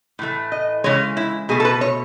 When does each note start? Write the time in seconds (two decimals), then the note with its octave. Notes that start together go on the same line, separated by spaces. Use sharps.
0.19 A2 E3 A3
0.52 D#5
0.84 C#3 E3 G#3 C#5
1.17 E4
1.49 B2 A3 G#4
1.60 A4
1.65 B4
1.81 C#5